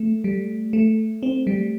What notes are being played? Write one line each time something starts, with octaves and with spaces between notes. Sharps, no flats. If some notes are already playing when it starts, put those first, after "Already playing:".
Already playing: A3
G3
A3
C4
G3